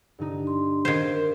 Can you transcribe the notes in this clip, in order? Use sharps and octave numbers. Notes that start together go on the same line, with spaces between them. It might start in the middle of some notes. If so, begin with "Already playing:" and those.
G2 D3 D#4
C6
D#3 C5 F5 G#6 D#7
A#4